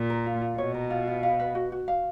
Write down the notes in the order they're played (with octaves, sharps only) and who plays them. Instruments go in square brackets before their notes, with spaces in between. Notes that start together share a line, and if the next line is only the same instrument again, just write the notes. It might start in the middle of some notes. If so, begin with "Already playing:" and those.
Already playing: [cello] A#2
[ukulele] A#4
F4
F4
[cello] B2 [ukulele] C#5
[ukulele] A#4
F4
F4
F5
B4
F#4
F#4
F5